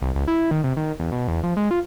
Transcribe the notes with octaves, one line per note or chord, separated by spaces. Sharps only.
C2
C#2
E4
D#3
C3
D#3
E2
B2
E2
F3
G#3
F4